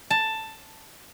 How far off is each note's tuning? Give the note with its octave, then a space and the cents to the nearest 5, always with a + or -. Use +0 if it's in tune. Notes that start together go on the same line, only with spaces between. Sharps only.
A5 +10